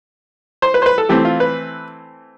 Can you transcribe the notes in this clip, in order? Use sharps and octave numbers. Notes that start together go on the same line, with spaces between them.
C5
B4
C5
B4
A4
E3 A3 C4 G4
F4
B4